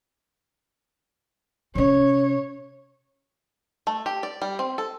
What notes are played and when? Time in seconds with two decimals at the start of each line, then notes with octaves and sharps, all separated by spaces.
1.75 C3 C#4 C#5
3.87 A3
4.06 G4
4.23 D5
4.42 G3
4.59 C4
4.78 A4